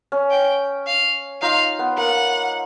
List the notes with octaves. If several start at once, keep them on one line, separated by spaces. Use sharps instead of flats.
C#4
G5
F5
D#4 F4 F5
B3
A#3 F#5